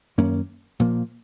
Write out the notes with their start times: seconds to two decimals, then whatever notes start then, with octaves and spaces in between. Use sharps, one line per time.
0.18 F#2 D#3 A#3 C#4
0.80 A#2 F3 A#3